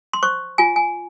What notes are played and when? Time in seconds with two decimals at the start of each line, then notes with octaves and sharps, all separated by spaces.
0.13 C6
0.23 C5 C#6
0.58 F4 G#5
0.76 G#5